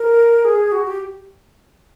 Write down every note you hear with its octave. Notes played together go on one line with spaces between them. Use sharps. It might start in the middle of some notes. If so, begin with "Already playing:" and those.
Already playing: A#4
G#4
F#4
G4